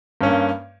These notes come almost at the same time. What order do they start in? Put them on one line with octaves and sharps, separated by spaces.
G2 C#4 A#3